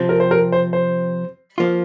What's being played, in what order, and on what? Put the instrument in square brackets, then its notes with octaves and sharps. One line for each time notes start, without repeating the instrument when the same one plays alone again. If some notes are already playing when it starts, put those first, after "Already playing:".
Already playing: [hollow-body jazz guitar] C3 F3 C4
[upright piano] A#4
C5
A#4
C5
C5
[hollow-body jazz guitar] F3 A#3 F4